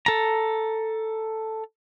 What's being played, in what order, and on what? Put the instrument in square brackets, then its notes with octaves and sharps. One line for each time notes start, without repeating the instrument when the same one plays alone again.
[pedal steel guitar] A4 A#5